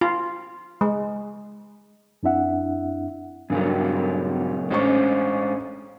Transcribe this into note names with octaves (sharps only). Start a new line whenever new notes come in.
F4
G#3
F#2 C4 D4 E4 E5 F#5
G2 A#2 C#3 F#3
A1 G#3 C#4 D4 C5 C#6